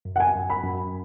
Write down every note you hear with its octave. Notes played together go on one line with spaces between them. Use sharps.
F#2
F#5
G#5
F#2
B5
F#2